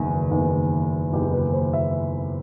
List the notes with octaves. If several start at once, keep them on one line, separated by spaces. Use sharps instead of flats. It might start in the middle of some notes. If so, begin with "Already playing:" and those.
Already playing: F#1 E2 D#3
F#1 E2 D#3
F#1 E2 D#3 G4
B4
C5
E5